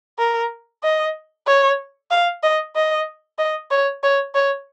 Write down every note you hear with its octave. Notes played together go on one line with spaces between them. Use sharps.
A#4
D#5
C#5
F5
D#5
D#5
D#5
C#5
C#5
C#5